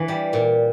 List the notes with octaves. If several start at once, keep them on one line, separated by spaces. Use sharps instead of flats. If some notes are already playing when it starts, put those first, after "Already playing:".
Already playing: E3 A#3
G3
A#2